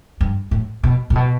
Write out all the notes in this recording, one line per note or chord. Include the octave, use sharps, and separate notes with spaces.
G2
A2
B2
A#2
B2